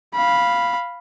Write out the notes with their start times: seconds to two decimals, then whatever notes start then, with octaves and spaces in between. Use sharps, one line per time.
0.15 F5 B5